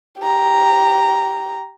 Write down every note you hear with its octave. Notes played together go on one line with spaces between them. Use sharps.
G4 A#5